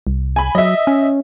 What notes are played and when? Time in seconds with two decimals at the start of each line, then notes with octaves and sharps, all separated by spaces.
0.07 C2
0.36 G#5 B5
0.55 F#3 D#5 E5
0.87 C#4